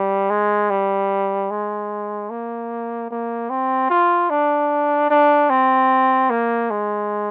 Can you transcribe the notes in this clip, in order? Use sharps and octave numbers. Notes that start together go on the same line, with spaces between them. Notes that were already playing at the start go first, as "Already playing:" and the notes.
Already playing: G3
G#3
G3
G#3
A#3
A#3
C4
F4
D4
D4
C4
A#3
G#3